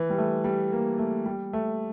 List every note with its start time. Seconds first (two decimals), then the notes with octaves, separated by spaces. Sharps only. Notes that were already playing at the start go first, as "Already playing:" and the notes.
Already playing: E3
0.10 G3
0.18 A3
0.44 G3
0.72 A#3
0.99 A3
1.26 G3
1.53 A3